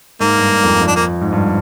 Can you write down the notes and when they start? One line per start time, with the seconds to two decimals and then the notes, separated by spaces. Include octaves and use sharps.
0.20 G#2 A#3
0.37 G2
0.55 G2
0.63 F2
0.81 F2
0.88 D4
0.96 A#3
1.21 G#2
1.33 G2